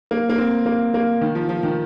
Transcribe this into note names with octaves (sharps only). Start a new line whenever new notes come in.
A#3
A#3
C4
A#3
A#3
D#3
F3
F3
D#3